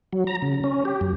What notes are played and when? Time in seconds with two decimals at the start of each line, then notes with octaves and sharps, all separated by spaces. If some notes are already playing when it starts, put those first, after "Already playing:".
0.13 F#3
0.27 A#5
0.42 C#3
0.64 C#4
0.85 G4
1.01 F#2